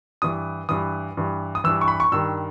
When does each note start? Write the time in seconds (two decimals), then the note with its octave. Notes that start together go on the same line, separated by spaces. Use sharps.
0.22 G2 E3 D#6
0.69 G2 E3 D#6
1.17 G2 E3
1.55 D#6
1.64 G2 E3 E6
1.81 C#6
1.88 B5
2.00 C#6
2.12 G2 D#3 E6